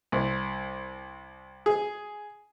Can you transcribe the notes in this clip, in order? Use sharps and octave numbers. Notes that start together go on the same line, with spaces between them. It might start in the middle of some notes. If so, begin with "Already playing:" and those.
C2
G#4